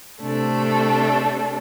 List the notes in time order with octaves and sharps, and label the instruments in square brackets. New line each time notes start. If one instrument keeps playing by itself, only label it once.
[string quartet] C3 A3 D4 A4